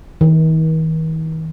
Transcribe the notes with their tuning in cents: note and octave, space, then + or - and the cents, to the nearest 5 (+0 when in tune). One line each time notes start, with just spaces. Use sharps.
D#3 +45